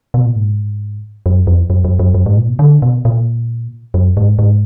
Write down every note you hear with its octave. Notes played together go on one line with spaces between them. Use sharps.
B2
A#2
G#2
F#2
F2
F#2
F#2
F#2
F#2
G#2
A#2
B2
D3
B2
A#2
F#2
G#2
G#2